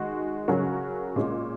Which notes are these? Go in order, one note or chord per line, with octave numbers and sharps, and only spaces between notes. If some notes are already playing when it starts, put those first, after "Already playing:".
Already playing: D#3 G#3 F#4
C#3 F#3 C#4 F#4 A#4
A#2 G#3 C#4